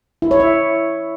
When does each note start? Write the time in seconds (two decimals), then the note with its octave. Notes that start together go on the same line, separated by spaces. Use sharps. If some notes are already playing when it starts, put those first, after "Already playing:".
0.22 E4
0.31 C#5
0.40 E5